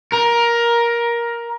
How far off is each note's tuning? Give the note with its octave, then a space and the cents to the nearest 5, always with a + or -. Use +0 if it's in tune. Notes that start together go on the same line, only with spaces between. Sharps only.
A#4 +15